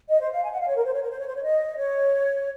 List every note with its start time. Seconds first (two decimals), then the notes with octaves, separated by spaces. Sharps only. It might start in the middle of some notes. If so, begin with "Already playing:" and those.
0.09 D#5
0.20 C5
0.31 F5
0.43 G#5
0.51 F#5
0.60 F5
0.68 C#5
0.76 A#4
0.85 C5
0.93 C#5
1.02 A#4
1.10 C5
1.18 C#5
1.27 C5
1.35 C#5
1.44 D#5
1.78 C#5